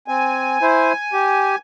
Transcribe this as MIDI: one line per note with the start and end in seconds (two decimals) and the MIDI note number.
0.08 0.58 60
0.08 1.58 80
0.62 0.93 64
0.62 0.93 72
1.13 1.56 67